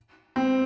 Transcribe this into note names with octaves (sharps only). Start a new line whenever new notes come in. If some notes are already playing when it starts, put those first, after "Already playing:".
C4